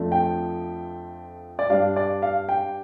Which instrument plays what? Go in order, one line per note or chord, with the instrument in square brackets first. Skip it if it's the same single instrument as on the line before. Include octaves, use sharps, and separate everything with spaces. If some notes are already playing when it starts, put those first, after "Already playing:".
Already playing: [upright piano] F2 F3 A3 D4
G5
D5
G2 G3 D4 F5
D5
F5
G5